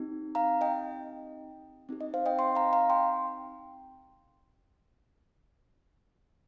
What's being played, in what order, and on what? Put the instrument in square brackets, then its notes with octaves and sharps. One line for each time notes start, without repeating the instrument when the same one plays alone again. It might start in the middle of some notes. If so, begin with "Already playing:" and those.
Already playing: [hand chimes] C4 D#4 G4
F5 A#5
D#5 G5
C4 D#4 G4
D#5
C5 F5
D#5 G5
G5 C6
F5 A#5
F5 A#5
G5 C6